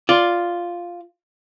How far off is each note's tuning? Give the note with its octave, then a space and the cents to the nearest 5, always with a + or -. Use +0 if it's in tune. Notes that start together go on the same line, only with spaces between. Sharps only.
F4 +0 D5 +0